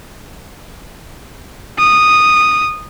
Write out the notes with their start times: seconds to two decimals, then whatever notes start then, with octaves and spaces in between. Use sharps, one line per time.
1.79 D#6